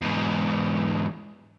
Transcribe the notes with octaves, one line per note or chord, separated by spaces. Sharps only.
E2 G#2